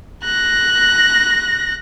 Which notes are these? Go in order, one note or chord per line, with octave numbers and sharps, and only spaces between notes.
F#6 A#6